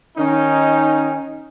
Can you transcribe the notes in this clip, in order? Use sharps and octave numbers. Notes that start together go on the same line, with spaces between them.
D#3 C#4 D#4